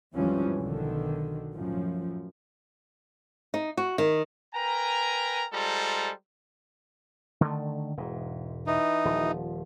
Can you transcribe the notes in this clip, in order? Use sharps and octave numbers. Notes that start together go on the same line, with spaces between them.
G#1 E2 E3 F3 G3 C#4
B1 D3 D#3
F#2 A2 F3
D#4
F#4
D#3
A#4 B4 G5 G#5 A#5
G3 G#3 F4 A4 C5 A#5
D3 D#3 A3
E1 G#2
E3 D#4
D#1 F3